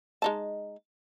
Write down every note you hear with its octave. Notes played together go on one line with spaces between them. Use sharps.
G#3 D#4 A5